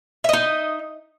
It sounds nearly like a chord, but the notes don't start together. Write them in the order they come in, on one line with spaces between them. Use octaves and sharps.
E5 D#5 D#4